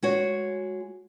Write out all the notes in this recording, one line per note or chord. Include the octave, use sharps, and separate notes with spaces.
G#3 F#4 C#5